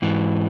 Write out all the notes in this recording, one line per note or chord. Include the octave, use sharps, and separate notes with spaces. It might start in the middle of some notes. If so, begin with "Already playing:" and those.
G#2 E3